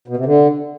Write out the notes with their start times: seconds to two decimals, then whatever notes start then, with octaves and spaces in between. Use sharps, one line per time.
0.08 B2
0.17 C3
0.26 D3